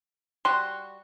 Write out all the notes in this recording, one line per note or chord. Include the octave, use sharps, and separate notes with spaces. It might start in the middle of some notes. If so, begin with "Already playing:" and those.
G3 F#4 C6